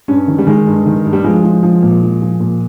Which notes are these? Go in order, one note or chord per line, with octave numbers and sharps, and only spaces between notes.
G2 C#4
D#3
G3
D#3 G#3
G2
D#3
G2
G3
F3 G#3
F3
F3
A#2
F3
F3
A#2